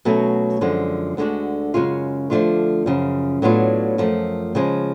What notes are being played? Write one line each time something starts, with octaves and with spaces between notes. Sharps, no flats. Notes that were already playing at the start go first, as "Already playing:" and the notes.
B2 F#3 A3 C#4
F#2 D3 F3 G#3
D2 D3 G#3 D4 F#4
F#2 C#3 G#3 C#4 F4
D3 F3 A3 D4 F4
F#2 C#3 F3
A2 F#3 B3 D4 F4
F#2 F3 A3
C#3 F3 G#3